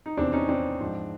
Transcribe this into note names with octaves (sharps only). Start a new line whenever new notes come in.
D#4
E2 C3 E3 C4 D4
C#4 D#4
C4 D4
G#2 F3